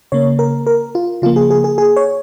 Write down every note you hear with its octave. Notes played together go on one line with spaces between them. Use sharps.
C#3 A#3 C#5
A#4
A#4
F4
C#3 F3 A#3 F4
G#4
G#4
G#4
G#4
C#5